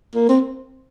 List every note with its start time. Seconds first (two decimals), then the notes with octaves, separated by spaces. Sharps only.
0.15 A#3
0.29 C4